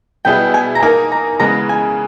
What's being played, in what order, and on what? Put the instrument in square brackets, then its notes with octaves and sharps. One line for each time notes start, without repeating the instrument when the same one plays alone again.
[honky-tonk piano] B2 G3 B3 E4 G#4 [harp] G5
[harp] G#5
A#5
[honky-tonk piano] A#3 D#4 A#4 [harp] G#5
[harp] A#5
[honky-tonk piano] C#3 E3 G#3 B3 [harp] A#5
[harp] G#5